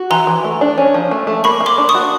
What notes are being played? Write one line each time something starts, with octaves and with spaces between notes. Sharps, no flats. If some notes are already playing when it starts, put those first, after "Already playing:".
Already playing: F#4
E3 A#5 C6
E3
A3
D4
C#4
F3
A3
A3
A#3 B5 C#6
A#3
C6 D6
D4
C#6 D#6
F#4